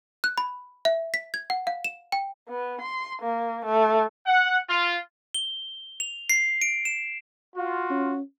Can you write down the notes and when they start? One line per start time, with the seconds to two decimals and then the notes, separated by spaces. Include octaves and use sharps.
0.24 F#6
0.38 B5
0.85 E5
1.14 B6
1.34 G#6
1.50 F#5
1.67 F5
1.84 E7
2.12 G5
2.49 B3
2.81 C6
3.22 A#3
3.65 A3
4.27 F#5
4.69 F4
5.34 G7
6.00 F7
6.30 C7
6.62 D7
6.85 E7
7.55 F4 F#4
7.90 C#4